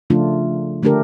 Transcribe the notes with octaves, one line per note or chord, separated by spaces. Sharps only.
C#3 F3 A3 D4 F4
D3 A3 D4 G4 A#4